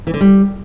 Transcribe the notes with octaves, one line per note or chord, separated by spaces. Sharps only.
E3
D3
G3